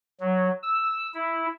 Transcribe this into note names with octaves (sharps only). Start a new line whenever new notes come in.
F#3
E6
E4